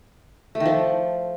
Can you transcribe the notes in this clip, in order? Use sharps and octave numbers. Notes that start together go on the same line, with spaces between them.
A3
D#3
F3